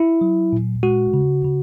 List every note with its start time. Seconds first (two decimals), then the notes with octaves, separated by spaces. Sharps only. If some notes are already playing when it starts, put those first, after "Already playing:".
Already playing: E4
0.21 F#3
0.53 A#2
0.83 G#3 F#4
1.14 C#3
1.45 C#3